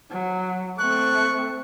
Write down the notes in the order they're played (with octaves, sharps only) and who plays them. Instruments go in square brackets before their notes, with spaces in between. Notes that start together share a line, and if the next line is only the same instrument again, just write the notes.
[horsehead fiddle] F#3
[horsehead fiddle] A3 C4 [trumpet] C#6 [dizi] F#6